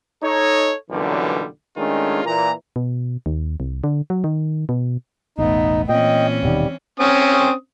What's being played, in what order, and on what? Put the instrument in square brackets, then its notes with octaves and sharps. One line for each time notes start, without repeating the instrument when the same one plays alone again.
[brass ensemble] D#4 A4 C#5
B1 F#2 A#2 D3 E3 G3
D#3 G#3 A3 C#4 D4 F4
A#2 E3 A#5
[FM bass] B2
D#2
C2
D3
F#3
D#3
B2
[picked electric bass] E1 A1 [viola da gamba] A3 B3 [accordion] D#4
[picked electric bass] A#2 [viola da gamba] E3 C4 C#4 [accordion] D#5 G5
[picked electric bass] D#1 B2 D#3 [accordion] G3
[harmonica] C4 C#4 D#6